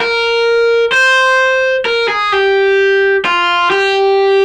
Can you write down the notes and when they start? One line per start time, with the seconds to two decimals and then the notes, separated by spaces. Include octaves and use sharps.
0.01 A#4
0.92 C5
1.85 A#4
2.08 G#4
2.32 G4
3.25 F4
3.70 G4